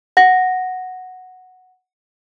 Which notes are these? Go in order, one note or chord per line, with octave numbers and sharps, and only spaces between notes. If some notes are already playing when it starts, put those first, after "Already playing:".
F#5 A#6